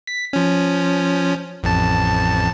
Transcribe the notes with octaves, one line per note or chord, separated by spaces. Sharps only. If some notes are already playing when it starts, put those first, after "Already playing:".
B6
F3 C#4
A1 F2 A5